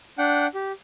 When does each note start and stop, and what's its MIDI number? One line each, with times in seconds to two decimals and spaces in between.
0.18 0.47 62
0.18 0.47 78
0.18 0.47 79
0.54 0.72 67